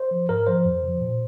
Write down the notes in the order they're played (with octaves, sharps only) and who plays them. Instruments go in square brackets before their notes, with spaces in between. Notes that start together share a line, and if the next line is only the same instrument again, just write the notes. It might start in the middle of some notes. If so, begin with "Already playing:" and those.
Already playing: [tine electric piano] C5
F3
G#2 A#4
F3 C5
F2
C#3 F3
A#2